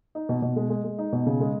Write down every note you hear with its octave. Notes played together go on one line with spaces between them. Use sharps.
D#4
B2
B2
G#3
G#3
G#3
D#4
B2
C#3
G#3